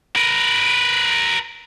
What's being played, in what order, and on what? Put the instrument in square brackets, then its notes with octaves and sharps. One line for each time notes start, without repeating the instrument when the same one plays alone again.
[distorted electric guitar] A#4 B4